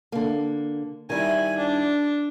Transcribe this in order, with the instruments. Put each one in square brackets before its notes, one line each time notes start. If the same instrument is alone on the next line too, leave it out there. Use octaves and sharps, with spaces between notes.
[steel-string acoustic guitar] D3 A#3
[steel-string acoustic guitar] D#3 G3 E4 [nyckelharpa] G#5
[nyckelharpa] D4